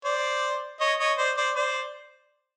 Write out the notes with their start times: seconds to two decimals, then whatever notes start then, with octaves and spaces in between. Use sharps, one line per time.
0.05 C5 D5
0.80 C#5 D#5
0.99 C#5 D#5
1.17 C5 D5
1.37 C5 D5
1.55 C5 D5